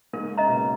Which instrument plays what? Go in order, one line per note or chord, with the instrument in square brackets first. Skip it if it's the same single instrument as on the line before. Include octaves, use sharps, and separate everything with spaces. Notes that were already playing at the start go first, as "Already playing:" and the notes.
[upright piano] G#2 [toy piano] A#4
[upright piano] C#3 [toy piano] D#5 A#5
[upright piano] B2